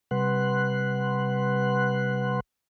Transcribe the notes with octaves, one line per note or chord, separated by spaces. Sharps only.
C3 G3 B4 F#5 C6 F#6